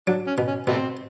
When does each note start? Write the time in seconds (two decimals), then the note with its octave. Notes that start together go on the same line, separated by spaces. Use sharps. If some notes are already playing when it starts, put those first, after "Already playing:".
0.07 F#3 D4
0.27 C#4
0.38 B2
0.47 C#4
0.67 B2 G3 A3 C4